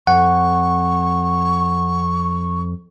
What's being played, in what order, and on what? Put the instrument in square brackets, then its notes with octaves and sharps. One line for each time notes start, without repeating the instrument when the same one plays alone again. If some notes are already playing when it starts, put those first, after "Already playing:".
[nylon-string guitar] F2 [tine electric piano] F#5 [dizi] C#6